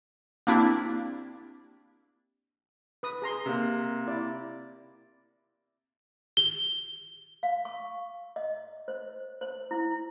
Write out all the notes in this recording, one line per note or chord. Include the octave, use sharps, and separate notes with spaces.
A#3 C4 D4 E4 G4
B4 D#6
G#4 A#5 C6
C3 A#3
E4 D5
G7
F5
C#6
D#5
C5
C5
E4